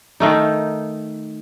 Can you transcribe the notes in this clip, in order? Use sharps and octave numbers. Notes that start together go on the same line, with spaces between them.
D#3 A3 D#4